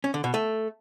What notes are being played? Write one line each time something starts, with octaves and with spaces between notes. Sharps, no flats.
C#4
D3
B2
A3